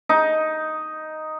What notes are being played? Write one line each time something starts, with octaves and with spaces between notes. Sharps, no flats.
D#4